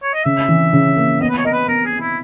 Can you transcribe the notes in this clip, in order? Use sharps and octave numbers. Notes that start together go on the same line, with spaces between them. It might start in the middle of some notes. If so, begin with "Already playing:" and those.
C#5
D#5
C#3 E5
E3
C#3
A#3
B3 D#5
B4
C#5
A#4 D#5
B4
B3 A#4
G#4
B3
E4